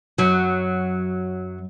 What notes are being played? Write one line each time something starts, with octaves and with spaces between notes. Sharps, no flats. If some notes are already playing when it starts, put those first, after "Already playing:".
F#2 F#3